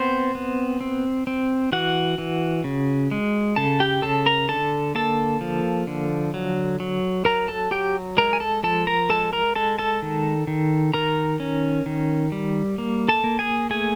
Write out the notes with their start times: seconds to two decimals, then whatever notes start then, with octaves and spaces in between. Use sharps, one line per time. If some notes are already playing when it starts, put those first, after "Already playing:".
Already playing: B3 C4 C5
0.35 B3
0.81 C4
1.27 C4
1.72 E3 F#4 F#5
2.18 E3
2.64 C#3
3.11 G#3
3.56 C#3 A4 A5
3.80 G4 G5
4.02 C#3 A4 A5
4.26 A#4 A#5
4.49 D3 A4 A5
4.95 A#3 A4 A5
5.41 F3
5.87 D3
6.34 F#3
6.80 F#3
7.25 F#3 A#4 A#5
7.48 A4 A5
7.71 F#3 G4 G5
8.17 G#3 A#4 A#5
8.33 G#5
8.40 A4 A5
8.63 F3 A4 A5
8.87 A#4 A#5
9.10 G#3 A4 A5
9.33 A#4 A#5
9.56 G#3 A4 A5
9.79 A4 A5
10.02 D#3
10.47 D#3
10.94 D#3 A#4 A#5
11.40 C#4
11.86 D#3
12.32 G3
12.78 A#3
13.09 A4 A5
13.24 A#3
13.39 G#4 G#5
13.70 A3 G#4 G#5